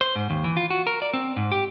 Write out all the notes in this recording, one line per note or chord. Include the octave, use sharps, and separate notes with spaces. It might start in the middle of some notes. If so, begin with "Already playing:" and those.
C5
G#2
D#2
E3
F4
F#4
A#4
D5
C4
G#2
G4